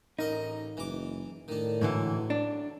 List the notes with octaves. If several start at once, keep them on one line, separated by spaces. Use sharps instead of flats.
A1 D#4 A#4 D#5
F#1 E3 D6
A2 D#3 D4
G#2 D3 E3 F#3
D4